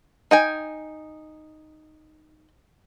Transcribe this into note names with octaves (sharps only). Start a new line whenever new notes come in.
D#4 G5 G#5